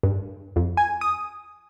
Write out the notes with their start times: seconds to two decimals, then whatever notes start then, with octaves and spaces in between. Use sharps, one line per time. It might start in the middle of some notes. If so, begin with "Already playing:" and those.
0.03 G2
0.56 F2
0.77 G#5
1.01 D#6